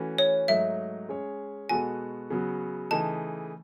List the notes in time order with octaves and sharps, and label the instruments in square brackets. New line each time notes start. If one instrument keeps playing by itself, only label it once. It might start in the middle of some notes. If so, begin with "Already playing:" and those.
Already playing: [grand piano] E3 A3 C#4 F#4 B4
[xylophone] C#5
[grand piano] G#2 F#3 A3 D#4 [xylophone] E5
[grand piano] G#3 C#4 G#4 C#5
[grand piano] B2 G#3 B3 F#4 A4 [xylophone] G#5
[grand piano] C#3 F#3 B3 F#4
[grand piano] C#3 E3 A3 D#4 [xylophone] A5